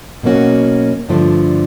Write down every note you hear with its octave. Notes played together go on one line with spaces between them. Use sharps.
B2 F#3 A#3 C#4 F#4
G2 D3 F3 A3 D4